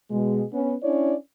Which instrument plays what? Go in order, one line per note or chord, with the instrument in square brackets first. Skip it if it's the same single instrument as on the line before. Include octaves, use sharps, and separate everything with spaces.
[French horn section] B2 G#3
B3 C#4
C#4 D4 E4 C#5 D5